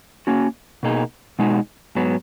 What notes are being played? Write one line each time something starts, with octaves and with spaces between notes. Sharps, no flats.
A#3 C#4 F#4
B2 A#3 D#4 G#4
B2 G#3 D#4 F#4
G#2 F#3 B3